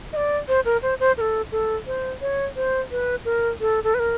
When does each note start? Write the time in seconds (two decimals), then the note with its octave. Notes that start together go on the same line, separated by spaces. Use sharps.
0.13 D#5
0.16 D5
0.48 C5
0.65 A#4
0.82 C5
1.00 C5
1.17 A#4
1.21 A4
1.52 A4
1.87 C5
2.21 C#5
2.56 C5
2.91 B4
3.25 A#4
3.61 A4
3.84 A4
3.94 B4
3.99 A#4